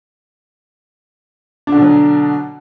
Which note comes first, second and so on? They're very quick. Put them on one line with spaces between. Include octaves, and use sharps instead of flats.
D4 D3 B2 F#3